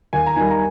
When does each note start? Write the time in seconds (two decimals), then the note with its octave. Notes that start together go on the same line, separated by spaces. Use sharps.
0.13 D#2 G#5
0.26 A#5
0.36 D#3 G3 G#5
0.51 A#5